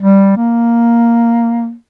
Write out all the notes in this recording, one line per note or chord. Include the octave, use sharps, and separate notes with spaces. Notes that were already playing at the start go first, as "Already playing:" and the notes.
G3
A#3